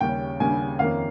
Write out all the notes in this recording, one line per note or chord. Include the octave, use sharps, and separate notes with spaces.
D#2 C#3 G3 C#4 G5
D#2 C#3 G3 C#4 G#5
F2 D#3 A#3 C#4 F5